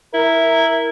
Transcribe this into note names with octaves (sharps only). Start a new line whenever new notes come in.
E4 A#4